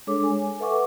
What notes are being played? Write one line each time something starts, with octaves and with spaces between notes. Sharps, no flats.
G#3 D4 G#4 A4 C#5 D6
G#5
A4 B4 E5 F#5 C#6 D6